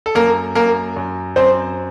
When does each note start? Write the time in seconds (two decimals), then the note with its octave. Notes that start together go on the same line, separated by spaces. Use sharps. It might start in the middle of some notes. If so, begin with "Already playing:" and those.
0.06 A4
0.15 F#2 A#3 A#4
0.55 F#2 A#3 A#4
0.96 F#2
1.36 F#2 C4 C5